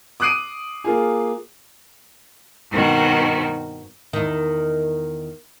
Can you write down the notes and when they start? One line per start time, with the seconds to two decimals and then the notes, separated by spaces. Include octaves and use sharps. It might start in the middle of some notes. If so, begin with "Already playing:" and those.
0.20 D6 D#6 F#6 C7 D7 D#7
0.84 A#3 F4 G#4
2.71 G2 B2 D#3 C4 F#4
4.13 E2 D#3